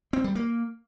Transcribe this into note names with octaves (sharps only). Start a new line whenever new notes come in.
C4
G3
A#3